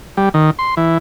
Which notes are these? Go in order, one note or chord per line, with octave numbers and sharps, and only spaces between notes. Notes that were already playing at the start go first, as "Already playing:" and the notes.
G3
D#3
C6
E3